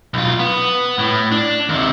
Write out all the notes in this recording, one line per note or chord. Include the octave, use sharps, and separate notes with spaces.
B1 F4
B3
A2
D4
D#2 C3